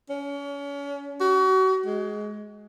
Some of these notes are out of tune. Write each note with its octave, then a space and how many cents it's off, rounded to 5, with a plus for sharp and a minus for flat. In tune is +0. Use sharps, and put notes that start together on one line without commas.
C#4 +35
F#4 +35
G#3 +15